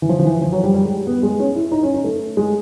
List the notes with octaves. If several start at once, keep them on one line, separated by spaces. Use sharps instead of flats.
E3
F3
F3
E3
F3
F#3
G3
G3
G#3
B3
G#3
C#4
E4
D#4
C#4
C#4
A3
G#3